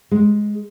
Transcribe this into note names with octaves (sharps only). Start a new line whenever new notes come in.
G#3